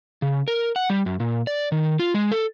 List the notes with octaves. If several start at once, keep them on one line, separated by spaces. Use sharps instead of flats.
C#3
A#4
F#5
G3
F#2
A#2
D5
D#3
F4
G#3
A4